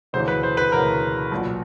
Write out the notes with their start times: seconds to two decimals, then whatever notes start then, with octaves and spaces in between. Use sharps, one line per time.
0.13 E1 D2 C#3 E3 C5
0.28 B4
0.43 C5
0.57 B4
0.72 E1 D2 C#3 E3 A#4
1.31 B1 A#2